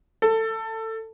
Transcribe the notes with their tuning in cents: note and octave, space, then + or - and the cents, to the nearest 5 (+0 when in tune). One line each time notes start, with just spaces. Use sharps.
A4 +20